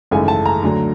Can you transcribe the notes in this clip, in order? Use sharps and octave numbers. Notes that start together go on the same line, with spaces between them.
G#1 F#2 C#3 E3 A3 G#5
A5
A#5
D2 D3 F#3